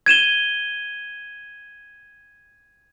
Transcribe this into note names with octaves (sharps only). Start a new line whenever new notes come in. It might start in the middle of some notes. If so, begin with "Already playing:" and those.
G#6 D#7 E7 G7